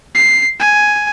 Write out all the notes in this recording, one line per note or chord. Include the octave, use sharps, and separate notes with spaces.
C7
G#5